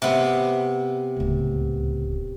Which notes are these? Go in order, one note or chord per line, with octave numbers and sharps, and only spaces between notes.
C3 B3
D1 C#2